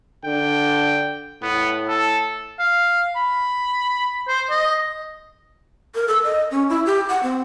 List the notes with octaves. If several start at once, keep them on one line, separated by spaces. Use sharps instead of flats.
D3 G5
A2 B3
A4
F5
B5
C5
D#5
A#4
A4
D#5
C#4
E4
G4
F#5
C4